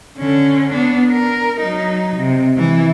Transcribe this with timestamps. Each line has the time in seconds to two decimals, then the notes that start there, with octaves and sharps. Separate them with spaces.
0.18 D3 C#4
0.73 B3 D4
1.10 A#4
1.61 F#3 D#4
2.17 C3
2.57 E3 E4